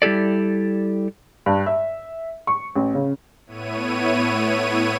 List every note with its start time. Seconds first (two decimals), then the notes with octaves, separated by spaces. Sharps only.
0.02 G3 E4 G4 A4 D5
1.46 G2
1.66 E5
2.47 C#6
2.76 A1
2.95 C#3
3.46 A2 B3 E4 C#5 D#7